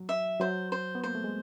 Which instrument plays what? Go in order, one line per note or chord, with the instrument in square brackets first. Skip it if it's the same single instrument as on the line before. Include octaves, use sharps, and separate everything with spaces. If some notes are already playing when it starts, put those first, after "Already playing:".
Already playing: [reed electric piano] F#3
[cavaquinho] E5
[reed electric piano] F#3 [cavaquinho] C5
[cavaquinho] C5
[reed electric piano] B3
[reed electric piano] A#3 [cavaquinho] C5
[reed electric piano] A3
G#3